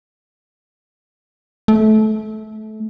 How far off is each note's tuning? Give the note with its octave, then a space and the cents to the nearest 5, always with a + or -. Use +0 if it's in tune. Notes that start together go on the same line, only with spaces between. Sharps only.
A3 -25